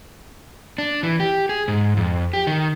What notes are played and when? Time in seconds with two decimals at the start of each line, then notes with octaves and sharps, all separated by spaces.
0.78 D4
1.03 E3
1.20 G4
1.49 G#4
1.68 G#2
1.97 F2
2.33 G4
2.47 D#3